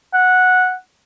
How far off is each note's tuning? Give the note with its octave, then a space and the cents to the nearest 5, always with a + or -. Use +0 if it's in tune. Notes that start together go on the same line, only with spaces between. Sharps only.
F#5 -10